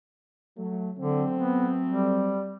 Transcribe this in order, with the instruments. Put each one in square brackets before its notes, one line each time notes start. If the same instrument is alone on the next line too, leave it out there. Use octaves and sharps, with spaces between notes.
[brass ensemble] F#3 A3
[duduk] D3 [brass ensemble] F#3 A3 C4
[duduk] B3
G3